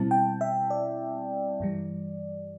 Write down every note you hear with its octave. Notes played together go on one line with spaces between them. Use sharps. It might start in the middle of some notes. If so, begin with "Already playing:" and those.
Already playing: B2 G3 C4 E4 A5
G5
E5
D5
G2 E3 G3